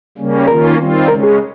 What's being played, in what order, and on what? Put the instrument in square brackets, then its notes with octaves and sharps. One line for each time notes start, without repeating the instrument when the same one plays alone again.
[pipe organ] C#3 G3 A#3 C#4
[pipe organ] D#3 A#3 C#4 F4 [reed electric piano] A#4
[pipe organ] D#3 G3 C4 F4
[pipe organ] C#3 G#3 C#4 [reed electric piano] A#4
[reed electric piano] G#4